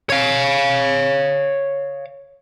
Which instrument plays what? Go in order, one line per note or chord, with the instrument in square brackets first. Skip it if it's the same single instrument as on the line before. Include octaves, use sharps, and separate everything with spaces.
[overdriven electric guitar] C#5 F5